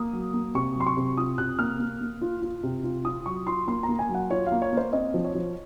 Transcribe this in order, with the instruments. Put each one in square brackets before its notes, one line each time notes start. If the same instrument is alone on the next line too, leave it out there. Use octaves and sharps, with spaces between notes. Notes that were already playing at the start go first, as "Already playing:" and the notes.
Already playing: [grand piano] A#3 D#6
F#3
A#3
C3 C#6
F#3 C6
C#6
C3
F4 D#6
C3 F#6
A#3 F6
A#3
A#3
F4
F4
C3
F4
F4 D#6
F#3 C#6
F4 C6
A#3 C6
A#5
A#3
G#5
F#3
F#5
F4 C#5
F5
A#3
C#5
A#3 C5
C4 D#5
F3
C#5
F3